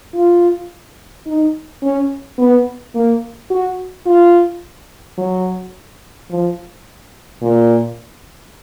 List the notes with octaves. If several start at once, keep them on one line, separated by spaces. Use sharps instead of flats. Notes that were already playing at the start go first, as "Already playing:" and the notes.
F4
D#4
C#4
B3
A#3
F#4
F4
F#3
F3
A#2